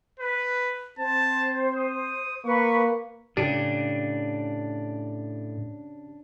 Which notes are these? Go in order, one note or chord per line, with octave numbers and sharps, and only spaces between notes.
B4
C4 C5 A5
D#6
A#3 B4 C#6
A2 C#3 D4 G4